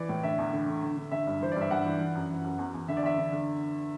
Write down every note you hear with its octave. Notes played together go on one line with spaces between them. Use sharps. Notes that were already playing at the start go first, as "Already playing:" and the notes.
Already playing: E3 D5
A2
D3 E5
E2
D3
D3
D3
D3
D3 E5
G2
E3 C5
G2 D5
E5
G2 F#5
E3
E3
F#2
E3
F#2
E2
E2
D3 E5
D5
E2 E5
D3
D3